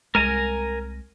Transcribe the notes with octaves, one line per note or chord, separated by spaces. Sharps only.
C2 G#3 A#4 G#5 A#5